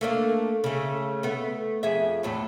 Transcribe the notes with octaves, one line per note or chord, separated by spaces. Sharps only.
A3 A#3 D4
C#3 A3
A3 B3
F2 G#4 E5
E2 A2 F#3